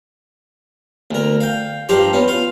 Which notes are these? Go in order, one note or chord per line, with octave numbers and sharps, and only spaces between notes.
D2 A#4
F5 G5
G2 F3 G4 A#5 C6
B3 C#4
F4 F5